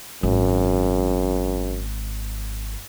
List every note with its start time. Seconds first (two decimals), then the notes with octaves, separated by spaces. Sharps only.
0.23 G#1 F#2